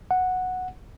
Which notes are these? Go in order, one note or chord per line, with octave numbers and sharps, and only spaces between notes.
F#5